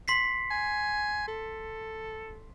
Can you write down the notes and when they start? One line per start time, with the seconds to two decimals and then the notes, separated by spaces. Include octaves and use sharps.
0.08 C6 B6 C7
0.51 G#5
1.28 A4